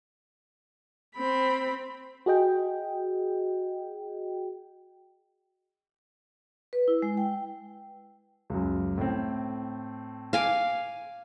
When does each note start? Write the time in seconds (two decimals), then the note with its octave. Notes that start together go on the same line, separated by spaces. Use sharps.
1.15 C4 B5
2.26 F#4 G#4 D#5 G5
6.73 B4
6.88 E4
7.02 G#3
7.17 G5
8.50 C#2 F#2
8.98 A2 C4
10.33 F5 G#5 D6